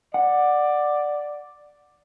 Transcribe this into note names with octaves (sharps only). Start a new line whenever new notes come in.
D5 F#5